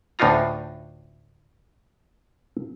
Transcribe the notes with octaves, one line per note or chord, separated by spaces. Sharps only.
D2 A2 D4 D#4 F4 A#5